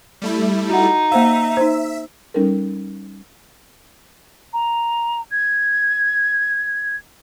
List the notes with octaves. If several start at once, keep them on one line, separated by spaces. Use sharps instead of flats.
G3 A3 E4
D#4 F#4 F#5
A#3 C5 E5 F5
D#4 C5
G3 C#4 D#4 A4 A#4
A#5
G#6